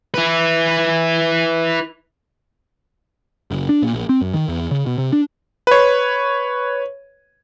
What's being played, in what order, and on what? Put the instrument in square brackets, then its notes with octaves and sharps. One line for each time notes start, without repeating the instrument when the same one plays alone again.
[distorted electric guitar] E4 B4
[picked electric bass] F#1
D4
A#2
A#1
C4
F#2
D#3
E2
C#3
B2
C3
D4
[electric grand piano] B4 C#5